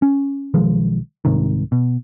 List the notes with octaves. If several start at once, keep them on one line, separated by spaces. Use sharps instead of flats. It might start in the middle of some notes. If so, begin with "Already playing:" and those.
C#4
B1 D#3 F3 G#3
C2 G#2 C3 D#3
B2